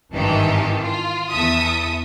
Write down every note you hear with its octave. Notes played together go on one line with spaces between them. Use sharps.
G#1 G2 D#3 E3 G4 A5
F4
E2 A4 E5 D#6